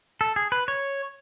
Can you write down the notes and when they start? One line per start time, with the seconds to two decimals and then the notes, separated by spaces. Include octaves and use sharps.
0.21 A4
0.36 G#4
0.52 B4
0.68 C#5